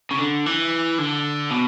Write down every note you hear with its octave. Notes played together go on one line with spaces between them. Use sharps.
C#3
D3
E3
D3
B2